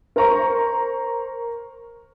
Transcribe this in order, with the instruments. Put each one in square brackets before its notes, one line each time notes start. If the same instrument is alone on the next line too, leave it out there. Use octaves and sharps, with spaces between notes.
[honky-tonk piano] A#4 C5 A#5 C#6